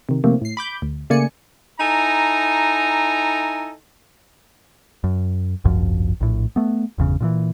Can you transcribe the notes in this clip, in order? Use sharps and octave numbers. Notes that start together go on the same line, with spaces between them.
C3 D#3
C3 D#3 F3 A3 A#3 C4
A2 C7
B5 D6 G6
D2
C#3 A3 A#3 D5 G#5 C#7
D#4 E4 A4 G#5 A#5
F#2
G#1 C#2 F#2 F3
A#1 A2
A3 B3
G1 E2 C#3
A#2 D3 E3